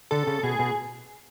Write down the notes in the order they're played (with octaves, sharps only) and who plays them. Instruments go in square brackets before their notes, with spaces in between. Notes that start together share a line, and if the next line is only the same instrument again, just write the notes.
[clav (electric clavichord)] D3 [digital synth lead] A4
[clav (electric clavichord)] C#3
[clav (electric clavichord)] B2 [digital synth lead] G#4
[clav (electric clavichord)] B2